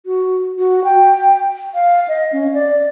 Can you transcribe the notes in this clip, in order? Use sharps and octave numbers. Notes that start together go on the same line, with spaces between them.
F#4
F#4
G5
F5
D#5
C#4
D5